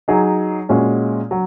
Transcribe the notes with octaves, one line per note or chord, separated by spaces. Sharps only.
F#3 D#4 G#4
A#2 G#3 C#4 F#4
F#3